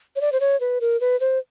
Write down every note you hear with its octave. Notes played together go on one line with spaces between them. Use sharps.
C#5
D5
C5
C#5
B4
A#4
B4
C5